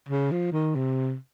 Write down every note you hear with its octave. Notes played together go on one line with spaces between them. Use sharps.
C#3
F3
D#3
C3